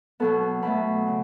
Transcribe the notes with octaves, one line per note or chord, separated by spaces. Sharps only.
B2 F#3 B3 A4
B2 F#3 A3 B5
C#3